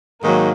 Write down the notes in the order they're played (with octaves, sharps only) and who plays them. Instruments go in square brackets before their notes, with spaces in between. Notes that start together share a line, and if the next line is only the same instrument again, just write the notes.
[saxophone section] G#2 D#3 F#3 [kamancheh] A#3